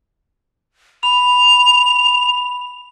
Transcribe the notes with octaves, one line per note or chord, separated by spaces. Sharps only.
B5 F7